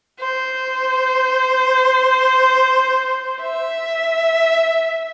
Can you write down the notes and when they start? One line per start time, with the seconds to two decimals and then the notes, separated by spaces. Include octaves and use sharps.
0.20 C5
3.42 E5